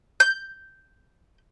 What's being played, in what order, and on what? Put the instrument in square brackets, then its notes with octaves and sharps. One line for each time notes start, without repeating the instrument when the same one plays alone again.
[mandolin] G6